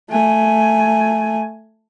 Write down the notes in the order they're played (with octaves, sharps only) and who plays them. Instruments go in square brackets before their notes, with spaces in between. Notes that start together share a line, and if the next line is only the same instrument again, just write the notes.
[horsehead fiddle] A3 G#5